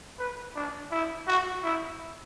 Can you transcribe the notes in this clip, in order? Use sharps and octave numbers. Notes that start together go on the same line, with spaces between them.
B4
D4
E4
F#4
E4